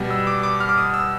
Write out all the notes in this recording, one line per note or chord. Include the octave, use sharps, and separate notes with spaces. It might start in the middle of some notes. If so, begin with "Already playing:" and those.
Already playing: B2 G3 B3
E6
D6
D6
F6
D6
D#6
E6